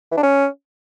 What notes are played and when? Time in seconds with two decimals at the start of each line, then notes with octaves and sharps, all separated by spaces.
0.11 E3
0.17 D4
0.23 C#4